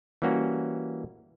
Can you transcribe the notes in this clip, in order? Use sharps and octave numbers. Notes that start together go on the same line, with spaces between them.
E3 G3 A#3 C#4 F#4